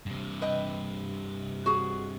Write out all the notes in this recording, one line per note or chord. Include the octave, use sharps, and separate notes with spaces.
G2 C3
B4 D#5 G5
F#4 G#4